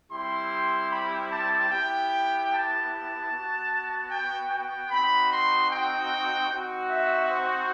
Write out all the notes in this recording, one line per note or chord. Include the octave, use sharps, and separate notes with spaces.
G3 C4 E4 G4 C6
B5
A5
B3 E4 G4 G5
A5
B3 F#4
G5
G5
C4 D#4 F#4 B5
C6
G5
C4 D#4 F#4
E5
C5